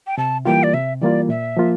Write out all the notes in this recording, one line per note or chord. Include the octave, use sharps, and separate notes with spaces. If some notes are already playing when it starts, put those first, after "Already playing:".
G5
C3 A5
E3 G3 A#3 F4 G5
D5
C3 E5
E3 G3 A#3 F4 D5
A#2 E5
F3 A#3 F4